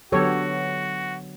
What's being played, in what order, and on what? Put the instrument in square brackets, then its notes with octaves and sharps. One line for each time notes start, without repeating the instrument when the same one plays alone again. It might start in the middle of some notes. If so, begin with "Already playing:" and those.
[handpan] D3 F#3 B3 [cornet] F#4 [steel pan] G4 A4 C#5